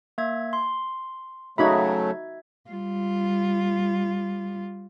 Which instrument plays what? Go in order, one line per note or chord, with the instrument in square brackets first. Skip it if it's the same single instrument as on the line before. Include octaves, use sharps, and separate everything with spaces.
[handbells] A#3 E5 G#6
C6
[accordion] C#3 F#3 A3 [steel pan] D#4 F#4 B5 [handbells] E5 G#6
[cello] G3 F4